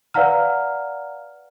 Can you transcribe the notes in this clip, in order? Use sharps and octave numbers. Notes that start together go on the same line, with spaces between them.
B4 D5 F5 F#5 A#5 F6